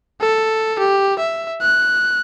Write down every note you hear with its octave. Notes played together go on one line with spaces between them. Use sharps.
A4
G4
E5
F#6